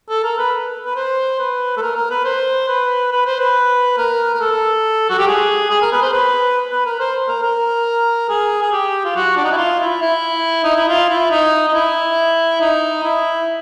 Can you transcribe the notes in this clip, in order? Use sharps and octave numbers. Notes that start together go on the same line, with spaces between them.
A4
A#4
B4
B4
C5
B4
A4
A#4
A#4
B4
C5
B4
B4
C5
B4
A#4
A#4
A4
F#4
G4
G#4
G#4
A#4
B4
C5
B4
B4
A#4
C5
A#4
A#4
G#4
G#4
G4
F4
F#4
D4
D#4
E4
F4
E4
E4
D#4
E4
F4
E4
D#4
D#4
E4
D#4
E4